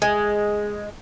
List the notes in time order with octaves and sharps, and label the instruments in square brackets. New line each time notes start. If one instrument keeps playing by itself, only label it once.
[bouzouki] G#3